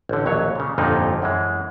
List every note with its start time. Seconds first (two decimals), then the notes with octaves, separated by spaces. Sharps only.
0.09 A1 D3
0.26 A#1 D#2 F#3 C#5
0.55 A#2 C#3
0.78 G1 F2 A#2 D3 F3 D#4
1.22 F#2 E3 G#3